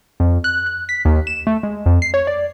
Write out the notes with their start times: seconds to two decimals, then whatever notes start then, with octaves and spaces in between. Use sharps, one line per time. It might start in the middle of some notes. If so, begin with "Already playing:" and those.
0.20 F2
0.44 F#6
0.66 F#6
0.89 B6
1.05 D#2
1.27 E7
1.47 A3
1.63 G#3
1.86 F2
2.02 C7
2.14 C#5
2.27 D5